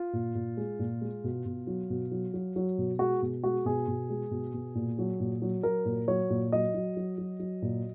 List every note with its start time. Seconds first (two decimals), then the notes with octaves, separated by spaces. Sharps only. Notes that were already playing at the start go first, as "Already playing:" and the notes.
Already playing: F4
0.13 A#2
0.35 A#2
0.57 G#3
0.79 A#2
1.01 G#3
1.24 B2
1.46 B2
1.67 F#3
1.90 B2
2.11 F#3
2.34 F#3
2.56 F#3
2.78 B2
2.99 G#3 F#4
3.22 B2
3.43 G#3 F#4
3.65 B2 G#4
3.88 B2
4.10 G#3
4.31 B2
4.54 B2
4.75 A#2
4.99 F#3
5.20 A#2
5.42 F#3
5.63 F#3 A#4
5.85 A#2
6.08 F#3 C#5
6.30 A#2
6.52 F#3 D#5
6.74 F#3
6.97 F#3
7.18 F#3
7.40 F#3
7.62 A#2